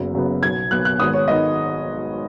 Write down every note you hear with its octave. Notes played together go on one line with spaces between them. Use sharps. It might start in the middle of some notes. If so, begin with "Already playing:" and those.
Already playing: F#1 F#2 C#3 B3
F#1 F#2 C#3 B3
B1 B2 B3 G#6
B1 B2 B3 F#6
F#6
G#1 G#2 D#3 G#3 B3 D#6
C#5
G#1 G#2 D#3 G#3 B3 D#5